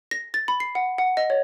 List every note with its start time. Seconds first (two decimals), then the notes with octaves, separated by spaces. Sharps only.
0.11 A#6
0.34 A6
0.48 B5
0.60 C7
0.75 F#5
0.98 F#5
1.17 D#5
1.30 C#5